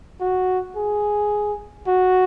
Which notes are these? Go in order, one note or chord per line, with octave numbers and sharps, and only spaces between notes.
F#4
G#4
F#4